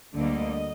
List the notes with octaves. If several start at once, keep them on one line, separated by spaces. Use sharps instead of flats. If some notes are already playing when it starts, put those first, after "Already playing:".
D2 D3 G3 A#3 D#5